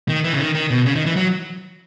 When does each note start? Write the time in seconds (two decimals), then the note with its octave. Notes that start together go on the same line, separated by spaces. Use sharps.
0.09 D#3
0.24 E3
0.33 C#3
0.39 D#3
0.55 D#3
0.71 B2
0.86 C#3
0.96 D#3
1.06 E3
1.16 F#3